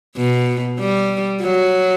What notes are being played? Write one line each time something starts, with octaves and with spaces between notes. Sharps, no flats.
B2
G3
F#3